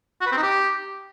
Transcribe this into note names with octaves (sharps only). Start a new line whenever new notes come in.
F#4
B4
C4
D#4
G4